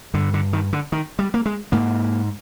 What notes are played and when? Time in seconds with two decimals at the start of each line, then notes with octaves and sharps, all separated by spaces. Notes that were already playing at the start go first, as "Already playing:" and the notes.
0.14 G2 D3
0.34 D3
0.53 D#3
0.73 D3
0.92 D#3
1.19 G3
1.34 A#3
1.46 G#3
1.72 G#2 A#3